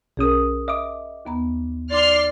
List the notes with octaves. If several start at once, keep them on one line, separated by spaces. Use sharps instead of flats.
B1 C#4 G#4 A#4 D#6
D#5 E5 D6
D#2 B3 A#5
D#4 D5 C6 F6 C7